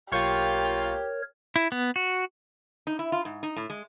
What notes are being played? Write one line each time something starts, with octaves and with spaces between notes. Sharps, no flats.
B1 A#3 F4 G4 A#4 C#5 C#6 G6
E4
B3
F#4
D#4
E4
F4
G#2
D#4
A2
G#3